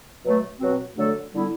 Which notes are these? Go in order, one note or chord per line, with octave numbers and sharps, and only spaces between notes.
B2 F#3 A3
B2 F#3 C4 F#4
D3 F#3 A3 D4 A4
D3 G3 B3 E4